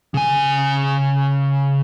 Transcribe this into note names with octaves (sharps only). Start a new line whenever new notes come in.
C#3 G#5